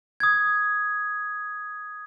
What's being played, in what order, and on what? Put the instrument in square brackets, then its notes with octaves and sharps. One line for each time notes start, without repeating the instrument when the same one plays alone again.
[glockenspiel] D#6 G#6